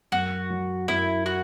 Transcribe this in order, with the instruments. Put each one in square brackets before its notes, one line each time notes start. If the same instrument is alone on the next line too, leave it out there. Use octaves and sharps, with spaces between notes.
[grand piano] F#2 [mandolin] F#4
[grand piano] F#3
[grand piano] F#2 [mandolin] E4
[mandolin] F#4